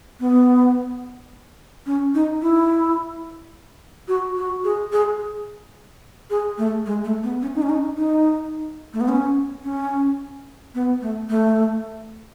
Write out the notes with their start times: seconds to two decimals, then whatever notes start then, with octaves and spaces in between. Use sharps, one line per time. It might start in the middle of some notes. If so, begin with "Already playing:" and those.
0.20 B3
1.86 C#4
2.15 D#4
2.42 E4
4.08 F#4
4.37 F#4
4.64 G#4
4.93 G#4
6.30 G#4
6.58 A3
6.86 G#3
7.04 A3
7.23 B3
7.42 C#4
7.55 D#4
7.62 C#4
7.69 D#4
7.97 D#4
8.93 A3
9.01 B3
9.08 C#4
9.63 C#4
10.75 B3
11.02 A3
11.29 A3